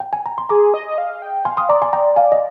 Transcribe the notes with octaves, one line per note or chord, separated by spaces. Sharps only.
G5
G#5
A#5
C6
G#4 A#5 D6
D#5
D#5
F5
G5
F5 G#5 C6
C6 D#6
D5 A#5 D6
G#5 C6
G5 A#5
F5 G#5
D#5